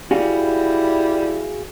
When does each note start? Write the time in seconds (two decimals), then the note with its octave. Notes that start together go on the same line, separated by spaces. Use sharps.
0.11 G3 E4 F#4 G#4 F5